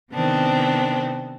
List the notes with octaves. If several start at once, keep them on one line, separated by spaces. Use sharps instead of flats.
C3 D#3 B3 C4 D4